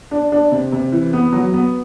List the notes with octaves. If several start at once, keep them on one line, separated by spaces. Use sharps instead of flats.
D4
D4
C3
C3
E3
B3
F#3
B3